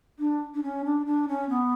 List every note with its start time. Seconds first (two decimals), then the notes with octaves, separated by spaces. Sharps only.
0.19 D4
0.54 D4
0.62 C#4
0.84 D4
1.06 D4
1.28 C#4
1.49 B3